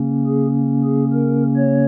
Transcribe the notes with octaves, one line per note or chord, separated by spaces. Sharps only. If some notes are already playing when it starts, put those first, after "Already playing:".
Already playing: C#3 A#3 C#4
G#4
G#4
A#4
C#5